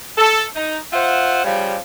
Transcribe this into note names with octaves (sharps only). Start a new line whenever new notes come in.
A4
D#4
F4 C5 E5 F#5
C#3 F3 G3